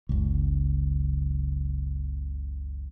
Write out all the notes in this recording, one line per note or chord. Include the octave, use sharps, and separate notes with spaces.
F#1 C#2